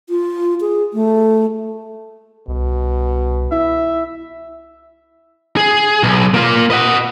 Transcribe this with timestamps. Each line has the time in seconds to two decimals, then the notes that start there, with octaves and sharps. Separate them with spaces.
0.09 F4
0.61 G#4
0.93 A3
2.48 C2 B2
3.52 E4 E5
5.57 G#4
6.03 B1
6.34 A#3 F4
6.71 D#5 F#5